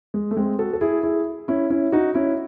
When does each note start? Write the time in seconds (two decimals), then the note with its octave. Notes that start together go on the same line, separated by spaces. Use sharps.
0.14 G#3
0.31 A3
0.37 G#3 C4
0.59 F#4 A4
0.73 A4
0.81 E4 G#4
1.03 E4 G#4
1.48 C#4 E4
1.70 C#4 E4
1.92 D#4 F#4
2.14 C#4 E4